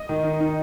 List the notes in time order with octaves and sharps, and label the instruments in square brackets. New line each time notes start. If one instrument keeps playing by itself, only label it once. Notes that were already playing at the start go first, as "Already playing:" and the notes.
Already playing: [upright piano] D#5
[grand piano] D#3
D#4
D#4